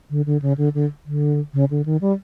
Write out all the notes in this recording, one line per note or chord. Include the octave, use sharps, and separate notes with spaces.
D3
D3
C#3
D3
D3
D3
C#3
D3
D#3
G3